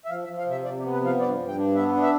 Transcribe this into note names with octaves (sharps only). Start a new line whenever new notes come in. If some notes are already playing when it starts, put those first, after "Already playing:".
E5
F3 F5
E5
F3
F5
C3 E5
C3 D5
G4
B3
B4
F3 F5
G2 D5
G2
G5
D4
B3 E5
D4
E5